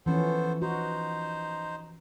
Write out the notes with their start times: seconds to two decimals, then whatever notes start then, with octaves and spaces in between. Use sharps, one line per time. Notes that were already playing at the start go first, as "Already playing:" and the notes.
0.06 E3 F3 B3 C#4 A4 C5
0.62 D#4 F#4 C5